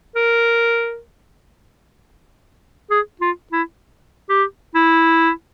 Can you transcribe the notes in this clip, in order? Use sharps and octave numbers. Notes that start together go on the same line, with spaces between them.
A#4
G#4
F4
E4
G4
E4